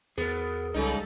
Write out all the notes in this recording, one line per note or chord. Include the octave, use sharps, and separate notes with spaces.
E2 B3 G#4 A#4
C2 C#3 G3 G#3 D#4 A4